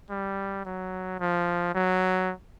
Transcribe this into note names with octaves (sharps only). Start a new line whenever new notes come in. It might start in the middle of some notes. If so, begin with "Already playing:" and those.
G3
F#3
F3
F#3